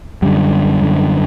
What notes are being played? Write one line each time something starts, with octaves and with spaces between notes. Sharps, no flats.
F#2 D3 G3
F#2 D3